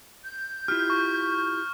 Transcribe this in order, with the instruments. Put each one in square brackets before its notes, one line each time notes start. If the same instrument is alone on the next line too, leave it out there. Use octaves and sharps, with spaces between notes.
[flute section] G6
[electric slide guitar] E4 F4 G4 [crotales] F6
[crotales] C#6